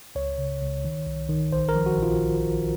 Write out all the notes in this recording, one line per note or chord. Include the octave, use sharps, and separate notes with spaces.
C#2 C#5
C#3
C#2
D#3
C2
D#3
A#1 C5
A#4
F3
F#4
A#1
F4